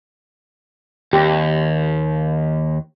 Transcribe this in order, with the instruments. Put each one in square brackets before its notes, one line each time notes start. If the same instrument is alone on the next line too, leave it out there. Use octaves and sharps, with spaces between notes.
[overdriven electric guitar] D#2 [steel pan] G4